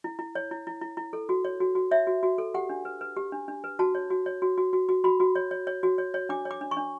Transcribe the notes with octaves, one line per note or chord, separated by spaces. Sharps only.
E4
E4
C#5
E4
E4
E4
E4
A4
F#4
C#5
F#4
F#4
C#5 E5
F#4
F#4
A4
G4 F#5
D4
B4
B4
G4
D4
D4
B4
F#4 A5
C#5
F#4
C#5
F#4
F#4
F#4
F#4
F#4 B5
F#4
C#5
C#5
C#5
F#4
C#5
C#5
D4 D6
C#5
D6
D4
C#6
D4